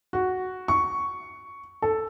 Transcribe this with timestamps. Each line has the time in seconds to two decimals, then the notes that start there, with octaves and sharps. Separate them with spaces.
0.13 F#4
0.68 C#6
1.82 A4